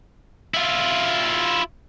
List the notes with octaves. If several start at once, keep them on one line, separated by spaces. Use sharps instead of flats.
E4 F4